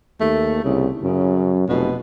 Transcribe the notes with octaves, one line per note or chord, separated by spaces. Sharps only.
D#2 A3
C2 C#3
F#2 C#3
F1 B2